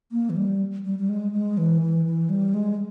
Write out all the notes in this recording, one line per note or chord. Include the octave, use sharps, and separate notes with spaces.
A#3
E3
G3
G3
G3
G#3
G#3
E3
E3
E3
G3
G#3